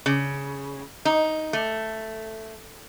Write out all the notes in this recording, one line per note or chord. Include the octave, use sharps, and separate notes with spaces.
C#3
D#4
A3